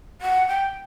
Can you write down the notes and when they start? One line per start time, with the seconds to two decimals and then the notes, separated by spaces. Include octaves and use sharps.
0.21 F#5
0.47 G5